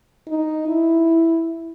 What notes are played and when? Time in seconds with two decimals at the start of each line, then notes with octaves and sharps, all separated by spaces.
0.28 D#4
0.68 E4